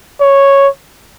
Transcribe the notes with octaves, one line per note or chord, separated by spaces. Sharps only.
C#5